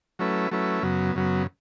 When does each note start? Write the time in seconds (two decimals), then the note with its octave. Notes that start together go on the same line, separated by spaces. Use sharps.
0.19 F#3 A3 C#4 E4 B4
0.51 F#3 A3 C#4 E4 B4
0.82 F#2 C#3 F#3 B3
1.15 F#2 C#3 F#3 B3